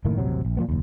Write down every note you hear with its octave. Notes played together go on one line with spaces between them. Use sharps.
F#1 A2 D#3 A#3
D#1 A1 C3 F#3
A#1
A#2 F3 A#3 B3
F#1 D#2